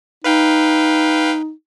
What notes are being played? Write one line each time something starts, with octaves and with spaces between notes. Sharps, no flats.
D#4 B4 F5 G5